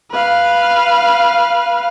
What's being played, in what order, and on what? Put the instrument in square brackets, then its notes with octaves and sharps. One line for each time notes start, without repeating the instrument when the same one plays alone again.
[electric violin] B4 F5